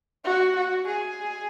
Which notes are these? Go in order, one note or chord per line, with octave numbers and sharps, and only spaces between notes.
F#4
F#4
G#4